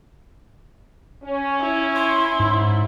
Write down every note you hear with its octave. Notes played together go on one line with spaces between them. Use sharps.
C#4
E4
C6
G#2